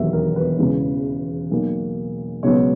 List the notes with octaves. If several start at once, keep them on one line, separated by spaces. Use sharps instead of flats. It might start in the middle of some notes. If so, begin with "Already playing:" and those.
Already playing: E1 D#2 D#3 F#3 B3 E5
A#4
B4
E1 E2 C#3 E3
B1 B2 A#3
C#2 B2 F#3 B3 C#5